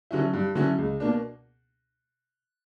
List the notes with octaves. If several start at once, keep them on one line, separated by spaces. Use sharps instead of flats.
D3 F#3 C#4 E4
G2
D3 F#3 C#4 E4
C#2
B2 A#3 D4